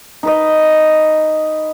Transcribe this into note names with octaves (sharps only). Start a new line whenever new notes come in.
D#4 B4 D#5